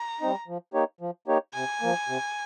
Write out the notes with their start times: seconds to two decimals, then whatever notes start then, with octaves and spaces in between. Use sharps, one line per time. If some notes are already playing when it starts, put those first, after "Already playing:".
Already playing: A#5
0.21 G3 C4 D#4
0.48 F3
0.74 A#3 D#4 G4 C#5
1.01 F3
1.28 A#3 D#4 G4 C#5
1.54 C3 G#5
1.81 F3 A#3
2.08 C3